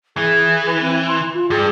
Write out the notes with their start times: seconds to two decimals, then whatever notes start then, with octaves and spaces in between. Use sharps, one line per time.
0.17 E3 G#4
0.67 B4
0.81 C4
1.08 C6
1.34 F4
1.50 G2 G#4